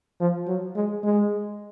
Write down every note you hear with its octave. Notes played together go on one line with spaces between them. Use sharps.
F3
F#3
G#3
G#3